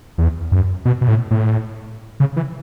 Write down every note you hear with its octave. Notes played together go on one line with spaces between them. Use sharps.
E2
F#2
B2
B2
A2
A2
C#3
E3